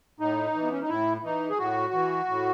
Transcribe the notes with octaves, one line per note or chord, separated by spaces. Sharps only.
A2 D#4
E3
B3
C#4
D#4
A2 E4
E3 D#4
G#4
A2 F#4
E3
A2